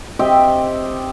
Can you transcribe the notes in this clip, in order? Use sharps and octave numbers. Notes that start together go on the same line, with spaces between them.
C4 G4 D#5 E5